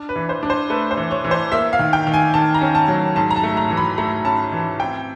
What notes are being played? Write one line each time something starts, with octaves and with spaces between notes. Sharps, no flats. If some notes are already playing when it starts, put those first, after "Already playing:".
Already playing: D4
B4
E3
C5
D4
C5
A3 B4
C5
E3
C#5
E3
C5
A#3 E5
F5
D#3
G5
D#3
G#5
D#3 A5
A#5
C#4
A5
F#3
G#2 A5
A#5
A5
A3
A#5
E3
B5
A3 A#5
C#4 A5
E3
C4 G5